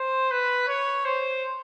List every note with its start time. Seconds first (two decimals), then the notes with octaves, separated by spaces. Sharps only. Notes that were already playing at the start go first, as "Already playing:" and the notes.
Already playing: C5
0.31 B4
0.68 C#5
1.05 C5